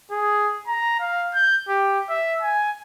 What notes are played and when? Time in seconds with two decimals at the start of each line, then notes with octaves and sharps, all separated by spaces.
0.11 G#4
0.67 A#5
1.00 F5
1.35 G6
1.68 G4
2.09 E5
2.42 G#5